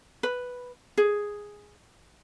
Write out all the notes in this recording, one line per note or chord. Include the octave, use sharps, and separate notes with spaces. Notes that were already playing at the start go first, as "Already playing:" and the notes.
B4
G#4